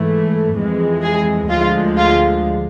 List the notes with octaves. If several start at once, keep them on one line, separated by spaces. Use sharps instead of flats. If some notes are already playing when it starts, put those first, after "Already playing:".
Already playing: G#2 E3 A3
F2 E3 G#3
G#4
D2 D3 F3 G#3 F4
F4